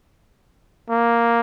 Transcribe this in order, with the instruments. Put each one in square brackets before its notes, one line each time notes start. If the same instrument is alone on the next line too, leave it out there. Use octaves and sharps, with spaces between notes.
[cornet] A#3